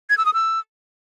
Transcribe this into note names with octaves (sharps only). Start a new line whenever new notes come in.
G#6
E6
D#6
E6